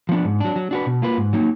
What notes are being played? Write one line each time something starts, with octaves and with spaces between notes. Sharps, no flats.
F3 B3 D4
G#2
F#3 D4
F#3
D4 F#4 B4
B2
A#3 F4 B4
G#2
F#3 A#3 D#4